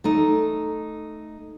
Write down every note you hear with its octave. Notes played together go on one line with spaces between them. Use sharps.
A3 D#4